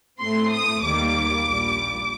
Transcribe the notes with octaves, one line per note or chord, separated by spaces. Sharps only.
A2 A3 C4 C6
D#6
D#2 D#3 G3 A#3 D6
A#1 A#2 G3